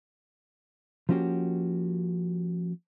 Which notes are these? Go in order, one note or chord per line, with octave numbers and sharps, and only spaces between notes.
F3 A#3 C#4 F#4 G4